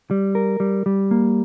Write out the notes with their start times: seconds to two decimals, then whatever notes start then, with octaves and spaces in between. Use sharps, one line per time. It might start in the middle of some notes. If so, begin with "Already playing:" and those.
0.11 G3
0.35 A#4
0.60 G3
0.86 G3
1.11 A#3